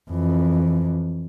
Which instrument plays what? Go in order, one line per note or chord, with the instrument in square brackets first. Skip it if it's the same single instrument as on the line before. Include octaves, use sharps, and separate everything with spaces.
[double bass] F2 E3